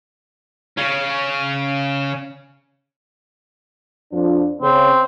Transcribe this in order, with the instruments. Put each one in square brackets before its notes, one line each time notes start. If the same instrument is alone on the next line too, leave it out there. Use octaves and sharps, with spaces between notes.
[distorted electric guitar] C#3 C#4
[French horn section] F2 F3 D4
[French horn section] C#3 [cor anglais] C4